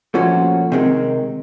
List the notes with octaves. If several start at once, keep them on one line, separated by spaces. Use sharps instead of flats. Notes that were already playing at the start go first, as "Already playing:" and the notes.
A#2 F3 A3 C#4 F#4
C3 D#3 G#3